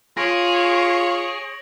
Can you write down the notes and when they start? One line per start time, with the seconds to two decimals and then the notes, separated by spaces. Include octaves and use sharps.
0.17 F4 G#4 C#5 A#6 D7 F#7